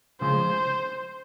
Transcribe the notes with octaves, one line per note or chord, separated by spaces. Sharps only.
C#3 F3 G#3 C5